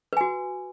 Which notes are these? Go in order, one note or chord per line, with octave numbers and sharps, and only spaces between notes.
F#4 B4 G#5